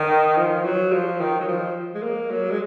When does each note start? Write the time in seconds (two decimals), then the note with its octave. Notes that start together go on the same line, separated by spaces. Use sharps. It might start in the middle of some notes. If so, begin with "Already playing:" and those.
Already playing: D#3
0.37 F3
0.65 F#3
0.92 F3
1.21 D#3
1.40 F#3
1.48 F3
1.95 G#3
2.03 A#3
2.31 F#3
2.51 G#3